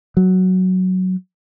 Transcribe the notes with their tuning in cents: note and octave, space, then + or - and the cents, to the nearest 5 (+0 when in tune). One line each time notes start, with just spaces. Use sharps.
F#3 +5